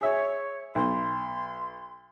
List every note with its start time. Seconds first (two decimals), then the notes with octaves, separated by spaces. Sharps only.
0.01 G#4 C#5 E5
0.75 B1 C6